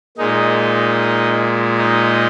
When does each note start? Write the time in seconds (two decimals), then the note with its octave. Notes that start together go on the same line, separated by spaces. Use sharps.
0.18 A#2 G#3 D#4
1.78 D#4